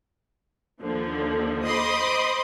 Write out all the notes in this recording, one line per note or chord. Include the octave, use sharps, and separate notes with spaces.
D#2 D3 F3
C5 D#5 B5 C6 D6 D#6